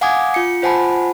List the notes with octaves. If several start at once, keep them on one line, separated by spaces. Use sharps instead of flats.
F5 F#5 G#5 D6 D#6 G#6
F4 C#7
F4 C5 F#5 G#5 A5 B5